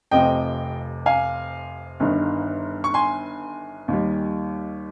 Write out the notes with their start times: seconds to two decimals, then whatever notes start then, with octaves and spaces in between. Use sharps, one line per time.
0.11 F1 F2 C3 F3 D#5 G5
1.06 F5 G#5
2.00 G1 G2 D#3
2.84 C#6
2.94 G#5 C6
3.88 D#2 D#3 G3